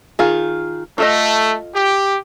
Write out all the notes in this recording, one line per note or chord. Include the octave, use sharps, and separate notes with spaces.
D#3 F4 G#4
A3 F4 A4 D#5
G4